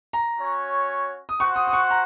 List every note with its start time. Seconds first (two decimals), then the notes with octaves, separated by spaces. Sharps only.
0.13 A#5
0.39 C#4 F#4 C#5
1.29 D#6
1.39 F#4 C5 F#5 C#6
1.56 D#6
1.67 D#6
1.73 C#6
1.90 A#5